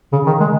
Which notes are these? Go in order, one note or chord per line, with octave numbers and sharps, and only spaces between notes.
C#3
D#3
G#3